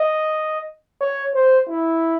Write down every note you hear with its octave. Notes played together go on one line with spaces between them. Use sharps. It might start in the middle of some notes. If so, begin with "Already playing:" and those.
Already playing: D#5
C#5
C5
E4